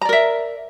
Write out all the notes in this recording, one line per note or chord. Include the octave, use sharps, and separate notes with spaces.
A#4 D5 E5 A#5